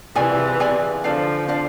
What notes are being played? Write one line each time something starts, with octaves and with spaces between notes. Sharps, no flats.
C3 E3 F4 G#4 D5 G#5
F4 G#4 D5 G#5
D3 F3 D4 A4 D5 F5
D4 A4 D5 F5